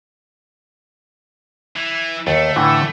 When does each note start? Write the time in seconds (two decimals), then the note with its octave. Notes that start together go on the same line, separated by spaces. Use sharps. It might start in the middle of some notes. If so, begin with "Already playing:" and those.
1.76 E3
2.27 D#2 A3
2.56 A2 D3 E3